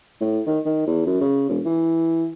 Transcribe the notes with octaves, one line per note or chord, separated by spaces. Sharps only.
A2
D#3
D#3
E2
F#2
C#3
E1
E3